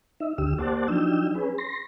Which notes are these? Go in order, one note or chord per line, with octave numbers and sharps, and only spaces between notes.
D#4 E5
D2 D3 G4 E6
A#3 G4 C5 D5 F#5 A5
F3 F#3 D4 D#4 G5 E6
C#4 G#4 B4
C6 A#6